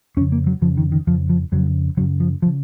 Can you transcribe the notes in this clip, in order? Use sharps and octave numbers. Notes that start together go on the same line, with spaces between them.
F2 C#3 C#4
A#3
F#3
F2 C#3 F3
D#3
D#3
F2 C#3 F3
F3
F2 C#3 F#3
F#2 C#3 F#3
F3
F3
C#3